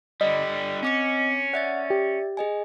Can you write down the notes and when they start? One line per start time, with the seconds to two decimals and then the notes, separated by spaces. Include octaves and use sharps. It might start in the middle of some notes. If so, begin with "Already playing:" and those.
0.21 D3 G3 D5 D#5
0.83 C4 C#4 D6 C#7
1.54 D5 E5 F#5 A6
1.90 G4
2.37 G#4 D#5 G#5